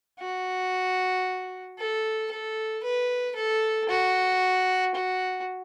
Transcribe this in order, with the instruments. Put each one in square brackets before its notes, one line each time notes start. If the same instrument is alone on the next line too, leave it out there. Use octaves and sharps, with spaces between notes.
[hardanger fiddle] F#4
A4
A4
B4
A4
F#4
F#4